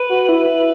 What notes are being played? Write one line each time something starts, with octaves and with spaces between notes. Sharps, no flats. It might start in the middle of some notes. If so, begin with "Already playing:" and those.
Already playing: B4
F#4
E4